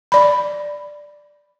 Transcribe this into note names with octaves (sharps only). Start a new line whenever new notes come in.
D5 B5